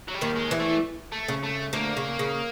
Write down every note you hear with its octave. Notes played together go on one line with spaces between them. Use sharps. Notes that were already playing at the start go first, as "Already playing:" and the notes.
F#3
G3
D#2 D#3
G#3
E2 E3
A3
A3
C#3
A3
D2 D3 A#3
C#3
C#3